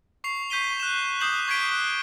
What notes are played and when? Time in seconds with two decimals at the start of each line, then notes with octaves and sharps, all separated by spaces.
0.24 C#6 C7 F7
0.50 C#6 G6 B6 D#7 G7
0.80 F#6 E7
1.21 D6 D#6 G6 C7 E7 F#7
1.48 C#6 G#6 B6 C7 D7 G7
1.71 F#6